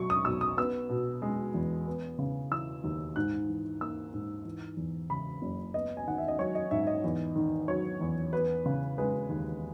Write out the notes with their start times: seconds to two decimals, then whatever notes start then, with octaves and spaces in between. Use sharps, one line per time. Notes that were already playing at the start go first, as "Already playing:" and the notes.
Already playing: B2 F#3 C#6
0.10 D#6
0.25 B1 E6
0.41 D#6
0.57 B3 E6
0.89 B2
1.22 G#3
1.54 E2
1.87 B3
2.19 C#3
2.51 E3 E6
2.84 D#2
3.16 G#2 F#6
3.49 E3
3.81 A#3 E6
4.14 G#2
4.45 E3
4.77 E2
5.10 C#3 B5
5.42 F#1
5.74 B3 D#5
5.97 G#5
6.07 D#3 F#5
6.18 E5
6.28 D#5
6.38 F#3 C#5
6.55 D#5
6.71 G#2 E5
6.87 D#5
7.04 E2
7.36 D#3
7.68 F#3 C#5
8.01 E2
8.33 B3 B4
8.66 C#3
8.98 G#3 B4
9.30 D#2